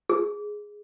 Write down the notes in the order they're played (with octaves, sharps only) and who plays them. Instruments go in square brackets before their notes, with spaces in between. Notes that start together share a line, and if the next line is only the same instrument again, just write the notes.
[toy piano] G#4